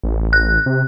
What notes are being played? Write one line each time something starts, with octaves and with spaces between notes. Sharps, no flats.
A1
F#6
C3